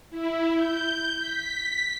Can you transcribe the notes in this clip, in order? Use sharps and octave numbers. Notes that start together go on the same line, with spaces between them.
E4
G6
B6